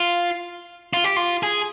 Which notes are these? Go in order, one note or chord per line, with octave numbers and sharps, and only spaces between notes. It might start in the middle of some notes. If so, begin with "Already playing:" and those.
Already playing: F4
F4
G4
F4
G#4